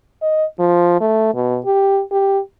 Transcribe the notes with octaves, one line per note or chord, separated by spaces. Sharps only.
D#5
F3
A3
B2
G4
G4